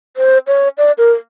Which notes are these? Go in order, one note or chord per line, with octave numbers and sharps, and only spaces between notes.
C5
C#5
D5
A#4